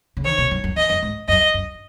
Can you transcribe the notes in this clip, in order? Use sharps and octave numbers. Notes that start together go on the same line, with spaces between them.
C#3
D#3 C#5
B2
F#2
F#2
E2 D#5
F#2
G#2
F#2 D#5
F#2